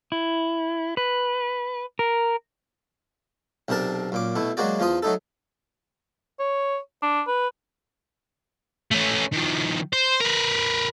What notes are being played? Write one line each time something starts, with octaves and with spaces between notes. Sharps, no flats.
E4
B4
A#4
B1 C3 D4 A#4 A5
F#2 A#2 D6
B2 A3 E4
F#3 G#3 A#3 F#4 D5
E2 F3 F4 D#6
F#3 A3 D#4 A4
C#5
D4
B4
A3 C#4
D#3 F3
C5
A#4 B4